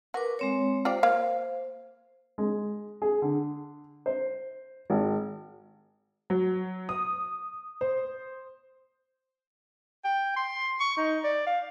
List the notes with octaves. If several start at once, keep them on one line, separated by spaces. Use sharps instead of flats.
F#4 A#4 B4 D6
G#3 C4 C#5
F4 G4 C5 D5
A#3 F5
G#3
G#4
D3
C5
G#1
F#3
D#6
C5
G5
C6
C#6
D#4
D5
F5